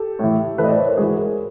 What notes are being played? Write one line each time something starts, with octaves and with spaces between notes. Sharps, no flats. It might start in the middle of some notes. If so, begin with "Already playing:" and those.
Already playing: G4 A4
A2 E3
A2 E3 A4 B4
D#5
C5 D5
B4 C#5
A#4 C5
G#2 E3 F#4 G#4
G#4 A#4